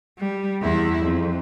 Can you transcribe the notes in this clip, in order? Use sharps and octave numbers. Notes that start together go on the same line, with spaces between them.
G3
E2 E4
F2